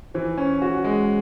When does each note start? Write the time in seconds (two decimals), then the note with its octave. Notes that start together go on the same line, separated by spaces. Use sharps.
0.14 E3 C5
0.38 C#4
0.62 F#4
0.84 G#3